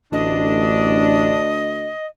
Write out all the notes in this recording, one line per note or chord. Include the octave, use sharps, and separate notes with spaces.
A1 D2 D4 D#5